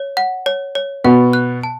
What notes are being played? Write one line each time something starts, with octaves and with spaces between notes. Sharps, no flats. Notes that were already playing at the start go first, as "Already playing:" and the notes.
Already playing: C#5
F#5
C#5
C#5
B2 B3 F#5
F#6
A5